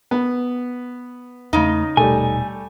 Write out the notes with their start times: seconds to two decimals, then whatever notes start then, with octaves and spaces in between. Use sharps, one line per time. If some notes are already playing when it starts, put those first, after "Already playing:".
0.11 B3
1.53 E2 C#3 A3 D#4
1.97 D#1 B2 G3 A3 G#5